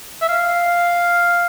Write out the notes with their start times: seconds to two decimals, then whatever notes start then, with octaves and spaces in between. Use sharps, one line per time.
0.21 E5
0.28 F5